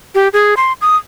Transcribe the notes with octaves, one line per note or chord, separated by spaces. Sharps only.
G4
G#4
C6
D#6